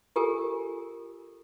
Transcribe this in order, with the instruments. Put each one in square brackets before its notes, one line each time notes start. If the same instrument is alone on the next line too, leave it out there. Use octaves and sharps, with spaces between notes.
[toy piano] F4 G4 A4 A#4 G#5